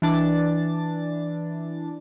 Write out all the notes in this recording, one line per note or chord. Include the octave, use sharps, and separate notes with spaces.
E3 D4 A6